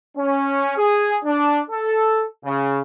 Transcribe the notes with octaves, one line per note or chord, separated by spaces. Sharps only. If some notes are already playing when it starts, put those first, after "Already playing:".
C#4
G#4
D4
A4
C#3